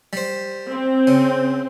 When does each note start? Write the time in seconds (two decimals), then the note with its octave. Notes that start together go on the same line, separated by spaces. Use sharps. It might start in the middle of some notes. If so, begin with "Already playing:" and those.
0.13 G3 C5
0.70 C4
1.07 C#3